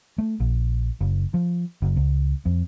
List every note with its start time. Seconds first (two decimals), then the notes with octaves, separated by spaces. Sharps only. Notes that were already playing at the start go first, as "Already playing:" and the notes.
0.18 A3
0.40 A#1
1.01 F#1
1.34 F3
1.82 F#1
1.96 C#2
2.46 F2